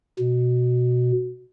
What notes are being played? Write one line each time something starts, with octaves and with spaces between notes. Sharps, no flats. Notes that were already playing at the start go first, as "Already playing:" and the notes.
B2